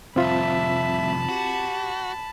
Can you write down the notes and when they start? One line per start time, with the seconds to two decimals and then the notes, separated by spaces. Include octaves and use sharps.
0.16 C2 F2 C4 F4 E5 A5 B5
1.29 F#4 G4